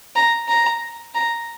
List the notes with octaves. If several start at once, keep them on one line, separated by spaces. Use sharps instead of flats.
A#5
A#5
A#5